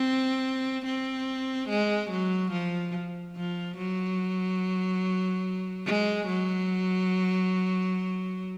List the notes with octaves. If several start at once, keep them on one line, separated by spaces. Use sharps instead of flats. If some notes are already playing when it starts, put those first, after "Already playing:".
Already playing: C4
C4
G#3
F#3
F3
F3
F#3
G#3
F#3